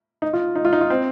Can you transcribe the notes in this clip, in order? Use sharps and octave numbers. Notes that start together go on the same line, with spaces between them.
D#4
F4
D#4
F4
D#4
F4
C4